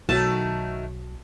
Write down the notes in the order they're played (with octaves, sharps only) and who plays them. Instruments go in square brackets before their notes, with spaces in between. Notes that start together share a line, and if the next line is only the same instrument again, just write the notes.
[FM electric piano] B1 F#3 [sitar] D#3 A3 F#4 [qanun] A5